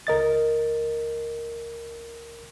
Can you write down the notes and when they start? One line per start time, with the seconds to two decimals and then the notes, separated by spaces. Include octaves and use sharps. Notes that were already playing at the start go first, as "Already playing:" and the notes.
0.07 C#2 A#4 D#5 A6